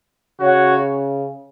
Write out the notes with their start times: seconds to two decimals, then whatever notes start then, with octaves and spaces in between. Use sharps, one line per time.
0.40 C#3 F#4 C#5 F#5